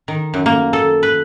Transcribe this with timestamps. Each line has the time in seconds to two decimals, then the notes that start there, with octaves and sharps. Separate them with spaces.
0.08 D#3
0.34 F#2
0.46 A#3
0.73 A4
1.03 B4